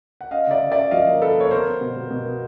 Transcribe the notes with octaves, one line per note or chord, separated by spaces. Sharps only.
F#5
C#4 D#5 F5
C#3 D5 E5
C#3
C#4 D5 E5
F3 D#5 F5
A#3
A#3 A4 B4
A#3 C#5
B3 A#4 C5
B3
B2
B2
B2
B3